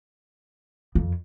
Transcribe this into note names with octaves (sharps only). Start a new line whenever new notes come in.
F2